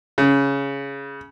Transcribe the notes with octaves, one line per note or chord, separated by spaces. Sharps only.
C#3